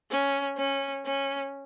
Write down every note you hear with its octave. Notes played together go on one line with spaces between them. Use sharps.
C#4
C#4
C#4